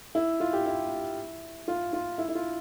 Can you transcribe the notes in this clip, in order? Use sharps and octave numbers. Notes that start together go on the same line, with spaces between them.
E4
F4
G4
E4
F4
F4
E4
E4
F4